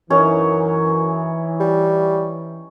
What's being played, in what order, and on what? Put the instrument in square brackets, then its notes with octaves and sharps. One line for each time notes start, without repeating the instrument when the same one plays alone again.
[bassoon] F#2 [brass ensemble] E3 [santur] C#4 D#4 C#5
[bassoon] G3